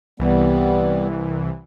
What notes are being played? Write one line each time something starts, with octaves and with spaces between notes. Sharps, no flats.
C2 E3 G3 B3